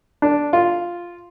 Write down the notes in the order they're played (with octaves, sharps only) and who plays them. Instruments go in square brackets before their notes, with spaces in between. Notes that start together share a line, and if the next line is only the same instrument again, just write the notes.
[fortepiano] D4
F4